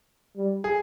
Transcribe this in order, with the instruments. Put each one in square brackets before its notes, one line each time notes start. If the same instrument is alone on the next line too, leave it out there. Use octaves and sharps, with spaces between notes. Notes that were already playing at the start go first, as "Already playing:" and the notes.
[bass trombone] G3
[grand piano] G#4